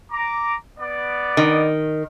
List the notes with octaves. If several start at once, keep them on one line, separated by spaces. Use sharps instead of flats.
A#5 D6
B3 D5
D#3